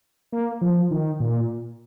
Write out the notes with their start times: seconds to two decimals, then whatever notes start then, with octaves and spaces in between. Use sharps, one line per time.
0.32 A#3
0.61 F3
0.91 D#3
1.20 A#2